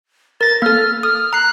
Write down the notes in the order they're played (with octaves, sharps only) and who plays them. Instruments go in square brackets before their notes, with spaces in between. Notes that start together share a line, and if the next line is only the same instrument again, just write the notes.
[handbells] A#4 A#6 [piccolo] A6
[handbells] A#3 A4 [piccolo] F6
[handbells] D#6 [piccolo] F6
[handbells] A#5 C7 [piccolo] F#6